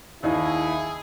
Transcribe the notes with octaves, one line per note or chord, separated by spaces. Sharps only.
D#2 D#4 E4 G#4